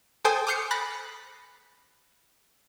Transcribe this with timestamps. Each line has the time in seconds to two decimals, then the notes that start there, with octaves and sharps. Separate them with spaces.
0.24 A4 C5 G5 G#5 D#6 G6
0.47 D6 D#6 F6 G6 C7 C#7
0.71 B5 F#6 A6 A#6